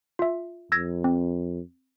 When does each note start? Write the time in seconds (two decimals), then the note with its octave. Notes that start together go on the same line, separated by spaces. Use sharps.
0.19 F4 E5
0.72 F2 E6 G#6 A#6
1.04 C4